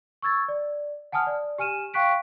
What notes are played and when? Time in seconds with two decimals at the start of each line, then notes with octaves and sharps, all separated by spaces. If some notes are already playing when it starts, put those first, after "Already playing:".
0.22 C#6 E6 G#6 A6
0.48 D5
1.12 F#5 G#5 A5 D#6 F6
1.27 D5
1.58 G4 G#5 F6 D#7 E7
1.94 F5 G5 C#6 F#6 B6 D7